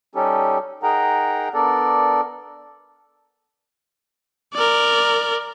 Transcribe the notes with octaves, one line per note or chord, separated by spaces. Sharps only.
G3 C#4 D#4 G4 A4
D#4 G#4 A#4 F#5 G5 A#5
B3 D4 A4 A#4 D5
A#4 D5